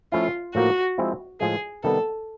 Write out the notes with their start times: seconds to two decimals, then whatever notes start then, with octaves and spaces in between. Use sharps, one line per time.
0.12 F3 A3 C#4 E4 F4
0.55 A2 F3 A#3 F#4
0.98 F3 G#3 C4 E4
1.40 A2 F3 G#3 G#4
1.84 C3 D#3 G3 B3 A4